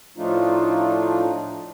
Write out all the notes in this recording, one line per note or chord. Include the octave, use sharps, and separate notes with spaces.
A2 F3 A3 D4 D#4 F4